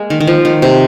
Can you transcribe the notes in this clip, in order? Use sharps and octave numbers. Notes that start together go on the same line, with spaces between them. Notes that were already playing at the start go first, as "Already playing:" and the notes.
Already playing: G#3 A#3
D#3
D#3
F3
D#3
C3